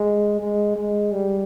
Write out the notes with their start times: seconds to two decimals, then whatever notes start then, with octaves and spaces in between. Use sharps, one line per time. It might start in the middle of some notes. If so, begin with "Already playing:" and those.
Already playing: G#3
0.39 G#3
0.76 G#3
1.12 G3